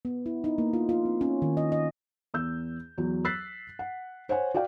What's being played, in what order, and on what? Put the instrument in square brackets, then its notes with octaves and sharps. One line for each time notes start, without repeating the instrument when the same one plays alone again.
[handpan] B3
E4
D#4
A#3
F4
F4
C4
C#4
D#3
D#5
D#5
[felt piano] E2 E6 G6
E2 F#3
E6 F#6 A6 B6 C7
F#5
C5 C#5 F#5 G#5
F#4 D5 F5 G5